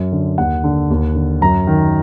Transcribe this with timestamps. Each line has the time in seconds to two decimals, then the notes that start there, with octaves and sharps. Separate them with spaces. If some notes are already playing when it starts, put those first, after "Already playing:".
Already playing: F#2
0.12 D3
0.38 D#2 F#5
0.64 D3
0.90 D#2
1.15 D3
1.41 F#2 A#5
1.67 D#3